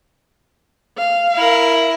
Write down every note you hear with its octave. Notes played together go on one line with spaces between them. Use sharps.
F5
E4 A#4